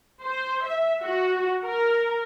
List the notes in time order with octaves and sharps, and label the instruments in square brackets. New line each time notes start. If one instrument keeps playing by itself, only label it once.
[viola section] C5
E5
F#4
A#4